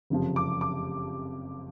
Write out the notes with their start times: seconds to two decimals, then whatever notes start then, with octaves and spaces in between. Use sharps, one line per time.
0.10 F#1 F2 C3 F3
0.36 D6
0.61 D6